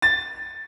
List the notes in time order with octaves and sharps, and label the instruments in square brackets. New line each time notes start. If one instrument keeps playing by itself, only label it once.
[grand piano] A6